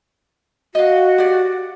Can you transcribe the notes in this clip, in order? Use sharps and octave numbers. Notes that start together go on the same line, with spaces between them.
F#4 D#5 F5
G4 D5